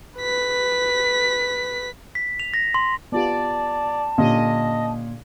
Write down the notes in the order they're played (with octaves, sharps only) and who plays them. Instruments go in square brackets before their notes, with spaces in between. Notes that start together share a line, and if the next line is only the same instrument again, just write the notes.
[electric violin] B4 B6
[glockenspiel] B6
F7
A#6
C6
[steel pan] B3 F4 G4 [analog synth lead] D5 [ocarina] A5
[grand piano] A#2 [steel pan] D3 C#4 G4 [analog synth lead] D#5